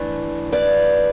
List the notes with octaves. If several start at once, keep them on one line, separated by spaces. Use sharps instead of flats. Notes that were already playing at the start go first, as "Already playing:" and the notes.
Already playing: E3 A3 D4
B4 D5